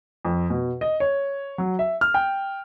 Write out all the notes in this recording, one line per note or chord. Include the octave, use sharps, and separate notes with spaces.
F2
B2
D#5
C#5
F#3
E5
F6
G5